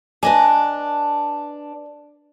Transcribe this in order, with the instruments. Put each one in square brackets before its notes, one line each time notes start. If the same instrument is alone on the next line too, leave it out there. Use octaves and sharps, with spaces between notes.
[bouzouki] D4 [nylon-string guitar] B4 D#5 G#5